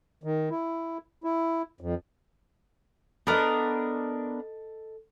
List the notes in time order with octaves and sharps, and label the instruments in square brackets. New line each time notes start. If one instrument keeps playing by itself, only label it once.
[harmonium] D#3
E4
E4
F2
[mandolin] B3 D4 A#4 [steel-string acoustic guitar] A4 D#5